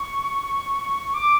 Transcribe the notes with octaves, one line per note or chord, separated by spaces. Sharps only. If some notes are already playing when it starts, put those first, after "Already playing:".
Already playing: C#6
D6